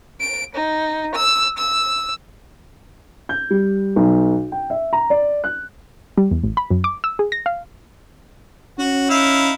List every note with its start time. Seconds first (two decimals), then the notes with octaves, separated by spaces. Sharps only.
0.21 D7
0.56 D#4
1.16 E6
1.59 E6
3.29 G6
3.50 G3
3.96 B1
4.52 G5
4.70 E5
4.93 A#5
5.10 D5
5.44 F#6
6.17 G3
6.31 E2
6.43 A1
6.57 B5
6.70 F#2
6.84 D6
7.04 E6
7.19 G#4
7.32 A#6
7.46 F5
8.79 C#4 F#4
9.10 D#4 E4 F5